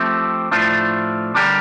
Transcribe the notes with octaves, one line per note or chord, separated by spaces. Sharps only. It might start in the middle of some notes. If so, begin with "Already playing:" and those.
Already playing: F3 A3 C4 G4
A2 F3 A3 D4 F4
D3 G3 D4 G4 A#4